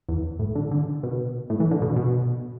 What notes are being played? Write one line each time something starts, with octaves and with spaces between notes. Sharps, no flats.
E2
A2
D3
D3
B2
A2
E3
D3
B2
B2